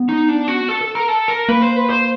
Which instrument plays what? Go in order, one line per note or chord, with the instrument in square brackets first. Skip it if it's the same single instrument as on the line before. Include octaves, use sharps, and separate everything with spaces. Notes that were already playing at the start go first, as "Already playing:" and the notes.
Already playing: [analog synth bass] B3
[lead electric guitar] D#4
D4
F#4
A4
A4
A#4
A4
A#4
[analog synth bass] A#3 [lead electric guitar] B4
[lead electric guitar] C5
B4
C5